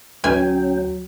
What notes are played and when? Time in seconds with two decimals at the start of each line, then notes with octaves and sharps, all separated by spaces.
0.24 D2 F#3 C#4 G5 G#5